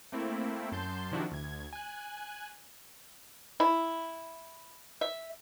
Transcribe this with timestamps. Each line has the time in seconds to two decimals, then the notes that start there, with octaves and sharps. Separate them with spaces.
0.12 A3 A#3 C4 E4
0.72 F#2 A5 C6 G6
1.11 C3 D#3 F3 D4 E4 F#4
1.32 D2 G#6
1.73 G#5 F#6
3.60 E4
5.01 E5